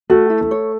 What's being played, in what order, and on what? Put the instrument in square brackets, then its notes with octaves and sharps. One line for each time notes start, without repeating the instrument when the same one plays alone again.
[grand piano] A3 [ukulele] F#4
[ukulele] E4
[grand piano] A3
[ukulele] C#5